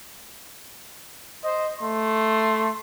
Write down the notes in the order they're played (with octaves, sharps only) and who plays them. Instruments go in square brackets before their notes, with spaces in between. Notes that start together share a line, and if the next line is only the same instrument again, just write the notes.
[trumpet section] C5 D#5
A3 C6